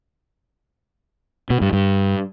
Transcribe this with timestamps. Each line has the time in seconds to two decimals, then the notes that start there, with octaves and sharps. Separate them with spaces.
1.50 B2
1.61 G2
1.73 G2